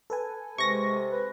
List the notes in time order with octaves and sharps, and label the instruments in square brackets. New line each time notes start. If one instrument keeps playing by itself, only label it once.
[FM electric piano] A4 B4 G#5
[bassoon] C3 [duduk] G#3 [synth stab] C#6 A#6
[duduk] B4